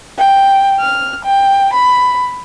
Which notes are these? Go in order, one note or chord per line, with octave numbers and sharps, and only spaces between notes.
G5
F6
G5
B5